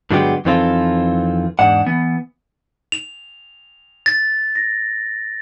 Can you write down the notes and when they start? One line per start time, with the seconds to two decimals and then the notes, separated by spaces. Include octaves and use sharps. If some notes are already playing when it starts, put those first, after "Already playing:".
0.11 G2 D3 F#3 G#3 B3 G4
0.45 F2 D#3 E3 C4 F4 A4
1.59 E2 G#2 D4 F#5
1.86 E3 B3
2.92 F7
4.06 A6
4.56 A#6